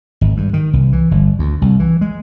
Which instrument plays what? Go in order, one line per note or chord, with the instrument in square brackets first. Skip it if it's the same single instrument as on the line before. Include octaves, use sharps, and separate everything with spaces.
[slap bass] G#1
G2
D#3
C2
E3
G1
D2
C2
E3
G#3